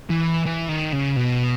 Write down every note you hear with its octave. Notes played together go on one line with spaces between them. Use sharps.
E3
E3
D#3
C#3
B2